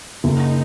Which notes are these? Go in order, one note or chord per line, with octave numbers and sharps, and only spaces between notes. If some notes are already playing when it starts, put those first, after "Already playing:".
F#1 D#4